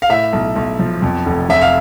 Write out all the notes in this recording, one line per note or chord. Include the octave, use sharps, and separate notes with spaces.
F5
A2 E5
B1
B1
F3
F2
F1
F1 E5
F5